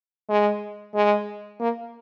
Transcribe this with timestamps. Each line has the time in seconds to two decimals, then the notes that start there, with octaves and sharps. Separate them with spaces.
0.30 G#3
0.95 G#3
1.60 A#3